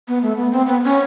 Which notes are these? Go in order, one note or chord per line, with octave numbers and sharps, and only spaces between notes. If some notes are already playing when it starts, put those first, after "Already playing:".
B3
A3
B3
C4
B3
C#4